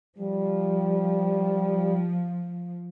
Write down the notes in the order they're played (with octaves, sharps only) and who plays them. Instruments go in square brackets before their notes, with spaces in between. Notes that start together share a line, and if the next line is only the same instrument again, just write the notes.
[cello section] F3 [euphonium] G3